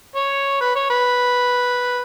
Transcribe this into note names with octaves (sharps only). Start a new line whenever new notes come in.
C#5
B4
C#5
B4